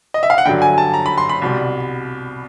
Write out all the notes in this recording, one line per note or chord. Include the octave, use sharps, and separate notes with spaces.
D#5
E5
F5
F#5
G2 D3 F#3 G5
G#5
A5
A#5
B5
C6
B5
C2 B2 G3